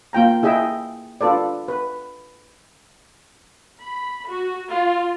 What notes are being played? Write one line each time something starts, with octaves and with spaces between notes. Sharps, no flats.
A#3 F4 G5 A#5
E4 G#4 D#5 E5 G5
D4 F4 A4 B4 D5
B4
B5
F#4
F4